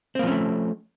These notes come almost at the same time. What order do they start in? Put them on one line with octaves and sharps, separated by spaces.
C4 A#3 F3 C#4 A3